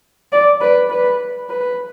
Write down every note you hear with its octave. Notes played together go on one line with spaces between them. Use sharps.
D5
B4
B4
B4